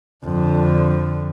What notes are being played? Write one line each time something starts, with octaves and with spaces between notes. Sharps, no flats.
F2 D3